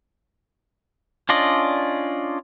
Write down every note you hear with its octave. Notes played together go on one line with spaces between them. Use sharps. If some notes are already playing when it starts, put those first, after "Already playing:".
C#4 D4 F4 D5 D#5